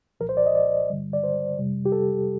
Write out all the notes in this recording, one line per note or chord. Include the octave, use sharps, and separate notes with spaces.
C2 A#2 F3 A#4
C5
D5
D#5
D5
G2 D3 G3
D5
C5
F2 C3 G3
G4
A4